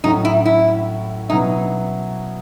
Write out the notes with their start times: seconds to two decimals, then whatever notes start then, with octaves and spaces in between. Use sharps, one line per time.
0.04 A2 F#3 C#4 D#4
0.25 E4
0.46 E4
1.29 B2 F#3 C#4 D#4 E4